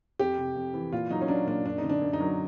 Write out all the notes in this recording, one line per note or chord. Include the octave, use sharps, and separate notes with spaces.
F2 G4
C3
F2
E3
A#2 F4
F#3 D#4
C#4
F#3 D4
A#2 D4
F#2 D4
D#4
D3
D4
F#2
D#4
F#3